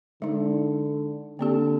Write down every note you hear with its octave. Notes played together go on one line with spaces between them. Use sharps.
D3 G#3 D#4
D3 A#3 C4 G4